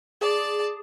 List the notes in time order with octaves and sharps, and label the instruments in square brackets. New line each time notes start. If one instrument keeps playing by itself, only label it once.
[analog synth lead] G#4 [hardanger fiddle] D5 A5